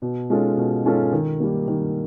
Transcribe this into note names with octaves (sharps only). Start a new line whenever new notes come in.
B2
G#3 C#4 F4 A4
B2
G#3 C#4 F4 A4
D#3
G3 A#3
D#3